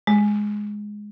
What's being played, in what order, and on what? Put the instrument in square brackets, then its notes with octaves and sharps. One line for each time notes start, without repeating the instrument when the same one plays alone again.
[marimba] G#3